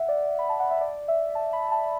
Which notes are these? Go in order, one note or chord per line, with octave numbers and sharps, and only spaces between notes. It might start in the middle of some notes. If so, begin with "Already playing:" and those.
Already playing: E5 F#5
D5
B5
A5
F#5
E5
D5
E5
A5
B5
A5